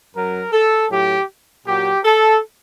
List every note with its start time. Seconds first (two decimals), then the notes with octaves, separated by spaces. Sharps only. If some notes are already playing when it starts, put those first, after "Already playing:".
0.14 F#2 F#3 A#4
0.52 A4
0.90 A2 F#3 G4
1.65 A#2 F#3 G4
2.03 A4